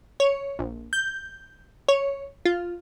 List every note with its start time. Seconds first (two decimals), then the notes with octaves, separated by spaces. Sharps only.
0.20 C#5
0.59 A#1
0.93 G6
1.88 C#5
2.45 F4